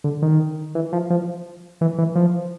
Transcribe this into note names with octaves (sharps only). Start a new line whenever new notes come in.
D3
D#3
E3
F3
F3
E3
E3
F3